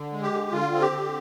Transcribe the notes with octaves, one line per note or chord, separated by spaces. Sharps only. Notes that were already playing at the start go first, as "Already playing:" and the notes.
Already playing: D3
G#3
G4
D3
D3 F4
C4
G4
D3